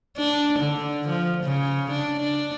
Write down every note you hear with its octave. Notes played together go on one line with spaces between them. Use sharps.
D4
D3
F3
C#3
D4
D4